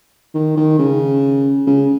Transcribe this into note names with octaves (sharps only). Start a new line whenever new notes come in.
D#3
D#3
C#3
C#3